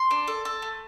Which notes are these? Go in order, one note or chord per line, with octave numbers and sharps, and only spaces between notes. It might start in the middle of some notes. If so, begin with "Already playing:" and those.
Already playing: C6
D4
A4
A4
A3